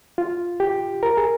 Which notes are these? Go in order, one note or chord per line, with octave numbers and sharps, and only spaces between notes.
F4
G4
A#4
G#4